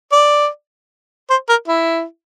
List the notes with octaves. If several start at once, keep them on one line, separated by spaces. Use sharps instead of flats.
D5
C5
A#4
E4